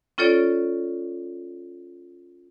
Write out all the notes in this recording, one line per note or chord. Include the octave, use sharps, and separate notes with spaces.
C#4 F4 A4 C#5 D5